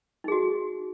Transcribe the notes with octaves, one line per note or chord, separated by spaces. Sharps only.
D#4 F#4 G#4